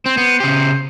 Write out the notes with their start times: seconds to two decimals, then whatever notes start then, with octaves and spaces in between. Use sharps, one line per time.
0.06 C4 C5
0.17 B3
0.40 C#3 G4